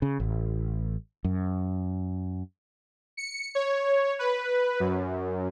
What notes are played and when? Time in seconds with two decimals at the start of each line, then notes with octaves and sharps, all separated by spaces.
0.02 C#3
0.20 A1
1.24 F#2
3.17 C#7
3.55 C#5
4.19 B4
4.80 F#2